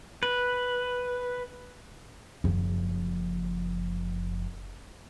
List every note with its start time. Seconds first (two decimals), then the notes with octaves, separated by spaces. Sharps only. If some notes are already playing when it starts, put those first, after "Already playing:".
0.23 B4
2.44 F#1 F3